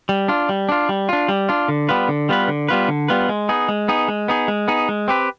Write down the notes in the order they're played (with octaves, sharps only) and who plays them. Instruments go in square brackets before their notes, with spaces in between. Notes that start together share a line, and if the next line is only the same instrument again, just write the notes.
[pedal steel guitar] G3
D4 F4
G3
D4 F4
G3
D4 F4
G3
D4 F4
D3
G3 B3 F4 B4
D3
G3 B3 F4 B4
D3
G3 B3 F4 B4
D3
G3 B3 F4 B4
G#3
B3 D#4 G#4
G#3
B3 D#4 G#4
G#3
B3 D#4 G#4
G#3
B3 D#4 G#4
G#3
C4 G4 B4